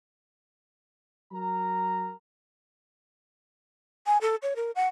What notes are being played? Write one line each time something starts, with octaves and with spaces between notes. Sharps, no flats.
F#3 A#4 A#5
G#5
A4
C#5
A#4
F#5